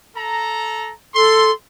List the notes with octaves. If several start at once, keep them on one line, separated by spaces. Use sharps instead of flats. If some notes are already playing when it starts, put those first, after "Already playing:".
A4 A#5
A4 C6